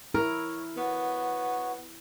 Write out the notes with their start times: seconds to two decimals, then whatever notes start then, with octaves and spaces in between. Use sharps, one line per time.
0.14 E4 A#4 C#5
0.77 B3 F#4 C#5